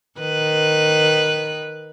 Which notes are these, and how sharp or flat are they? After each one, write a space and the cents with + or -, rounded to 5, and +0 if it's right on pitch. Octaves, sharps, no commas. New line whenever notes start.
D#3 -10 B4 +0